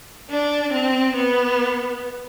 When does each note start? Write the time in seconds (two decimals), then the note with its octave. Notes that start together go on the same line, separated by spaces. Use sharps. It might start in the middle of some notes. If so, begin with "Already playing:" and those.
0.29 D4
0.73 C4
1.16 B3